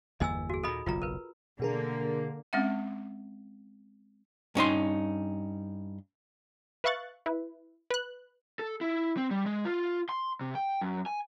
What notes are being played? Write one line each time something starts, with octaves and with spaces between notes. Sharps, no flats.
G1 E2 A#3 D#5 G#5 E6
F#4 G#4
D#2 A#2 A4 D#5 B5
F#1 B1 E2 F4 A#5
A#4 B4
B2 D3 A#3 G#4 A#4
G#3 C4 C#4 E5 F#5
G2 C#4 D#4 C6
B4 E5 F5 C#6 F#6 A6
E4 B4
B4 F#6
A4
E4
C4
G3
G#3
F4
C6
C3
G5
F#2
G#5